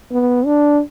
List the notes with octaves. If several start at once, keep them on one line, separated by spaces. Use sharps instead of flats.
B3
D4